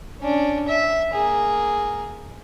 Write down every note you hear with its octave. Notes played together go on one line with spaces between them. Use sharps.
C#4 D4
E5
A#3 G#4